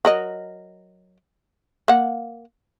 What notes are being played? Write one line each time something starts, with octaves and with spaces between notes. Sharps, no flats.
F#3 A#4 D#5
A#3 F#5